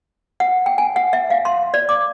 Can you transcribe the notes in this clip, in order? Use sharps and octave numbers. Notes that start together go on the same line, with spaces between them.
F#5
G5
G#5
F#5
E5
F5
C6
D5
D6